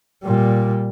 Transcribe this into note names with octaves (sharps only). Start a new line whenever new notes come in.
A#2 G3